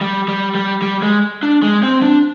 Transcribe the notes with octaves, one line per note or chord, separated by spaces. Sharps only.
G3
G3
G3
G3
G#3
D4
G#3
C4
D4